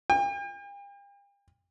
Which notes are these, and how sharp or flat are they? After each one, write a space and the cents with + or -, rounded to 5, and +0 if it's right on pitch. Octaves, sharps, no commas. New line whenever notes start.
G5 +45